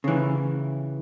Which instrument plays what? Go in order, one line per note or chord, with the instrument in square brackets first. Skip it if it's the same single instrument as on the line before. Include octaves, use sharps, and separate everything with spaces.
[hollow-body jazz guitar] C#3 E3